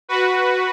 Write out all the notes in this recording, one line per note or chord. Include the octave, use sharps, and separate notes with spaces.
F#4 B4